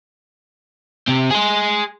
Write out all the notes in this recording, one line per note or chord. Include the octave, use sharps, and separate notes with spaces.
C3 C4
G#4 C6